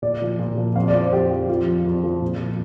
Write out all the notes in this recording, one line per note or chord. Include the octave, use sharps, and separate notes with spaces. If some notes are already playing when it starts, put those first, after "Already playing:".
A#2 D5
F3
A#2
F3
F2 F5
D5
F3
C5
F2 G4
F3
F2 F4
F3
F2
F3
A#2
F3